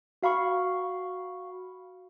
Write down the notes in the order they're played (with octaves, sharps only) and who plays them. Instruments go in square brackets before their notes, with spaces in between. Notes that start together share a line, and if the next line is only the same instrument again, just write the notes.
[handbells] F#4 F5 B5 C#6